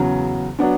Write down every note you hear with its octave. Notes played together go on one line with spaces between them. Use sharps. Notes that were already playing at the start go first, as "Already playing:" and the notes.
Already playing: E2 C#3 F#3
F#3 B3 D4